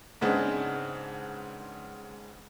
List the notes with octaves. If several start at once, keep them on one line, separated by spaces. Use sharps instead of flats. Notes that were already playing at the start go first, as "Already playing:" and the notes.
G#2 C#3 G#3 B3 C4 D4